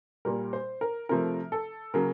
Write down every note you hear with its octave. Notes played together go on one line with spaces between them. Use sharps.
A#2 G3 A#3 A#4
C5
A#4
C3 F3 A3 A#4
A4
C#3 F#3 A#3 A#4